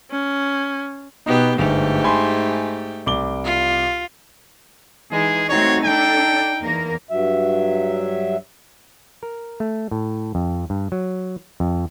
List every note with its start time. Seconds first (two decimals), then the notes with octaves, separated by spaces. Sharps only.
0.11 C#4
1.26 B2 B3 D#4 G4 B4
1.58 G1 G#2 A3 G4
2.04 G#5 B5 C6
3.06 C2 D6 G7
3.44 F4
5.12 E3 G#3 D#4 G#4
5.49 A3 C4 D#4 F#4 C#5
5.84 D4 A4 G5
6.61 E2 A#3 A#4
7.10 G2 F#3 E5
9.23 A#4
9.60 A3
9.91 A2
10.35 F2
10.70 G2
10.92 F#3
11.60 F2